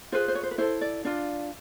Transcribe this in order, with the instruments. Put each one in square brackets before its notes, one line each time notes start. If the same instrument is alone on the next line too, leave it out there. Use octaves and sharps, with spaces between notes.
[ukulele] F4 G#4 B4 C5
C5
C#5
C5
B4
E4 A4 C5
D5
D4 F4 D5